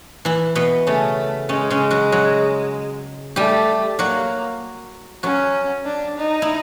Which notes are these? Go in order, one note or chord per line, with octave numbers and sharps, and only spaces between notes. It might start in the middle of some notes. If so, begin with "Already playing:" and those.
E3 E4
B2 B3
C#3 A3 C#4
C#3 G#3 C#4
C#3 C#4
F#3 F#4
F#3 F#4
G3 A3 G4
F#3 A#3 F#4
F#3 C#4 F#4
D4
D#4
E4